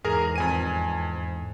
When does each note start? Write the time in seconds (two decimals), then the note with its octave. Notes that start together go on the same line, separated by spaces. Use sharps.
0.04 E2 G#2 G#4 A#4 A#5
0.36 F2 G#5 D#7